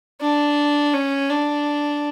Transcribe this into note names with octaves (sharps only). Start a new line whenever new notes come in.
D4
C#4
D4